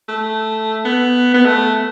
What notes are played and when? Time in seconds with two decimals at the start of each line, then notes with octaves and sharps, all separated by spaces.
0.09 A3
0.85 B3
1.34 B3
1.46 A3